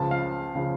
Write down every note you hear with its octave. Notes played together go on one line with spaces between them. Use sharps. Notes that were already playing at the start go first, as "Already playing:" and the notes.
Already playing: C#2 C#3 F3 A5
F5
C#3 F3